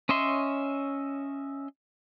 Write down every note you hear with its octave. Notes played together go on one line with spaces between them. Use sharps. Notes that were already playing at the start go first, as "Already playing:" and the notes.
C#4 C#5 D#5 E5 C6